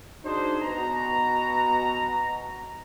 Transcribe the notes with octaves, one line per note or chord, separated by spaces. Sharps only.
D4 D#4 F#4 G#4 C5
B2 F#4 A#5